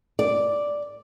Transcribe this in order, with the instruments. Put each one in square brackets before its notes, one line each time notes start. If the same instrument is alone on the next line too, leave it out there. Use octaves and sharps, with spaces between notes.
[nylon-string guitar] D5